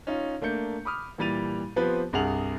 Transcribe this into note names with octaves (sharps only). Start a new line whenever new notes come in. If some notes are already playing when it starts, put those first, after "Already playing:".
C#4 D#4 F4
A3 A#3 D4 G6 C#7
B5 D6 D#6 F6
A#2 E3 G3 A6 D#7 F7
F3 B3 C4 G4 B4 C5
C2 G2 G#4 F#5 F7 F#7